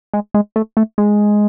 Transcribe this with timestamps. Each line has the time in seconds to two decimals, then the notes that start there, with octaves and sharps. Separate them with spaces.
0.13 G#3
0.34 G#3
0.56 A3
0.77 A3
0.98 G#3